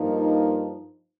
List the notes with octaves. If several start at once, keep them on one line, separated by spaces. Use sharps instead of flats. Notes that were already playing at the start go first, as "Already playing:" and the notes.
Already playing: G2 F3 A#3 D#4